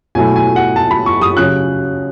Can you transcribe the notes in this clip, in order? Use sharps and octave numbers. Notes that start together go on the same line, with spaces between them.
B2 F#3 A3 E4 G#5
G#5
F#5
A5
B5
C#6
D#6
C#3 F#3 C#4 F#6